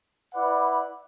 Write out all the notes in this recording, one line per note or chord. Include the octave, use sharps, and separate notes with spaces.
E4 B4 D5 F#5